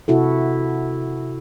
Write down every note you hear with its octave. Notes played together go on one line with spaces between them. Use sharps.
C3 E4 F#4 A4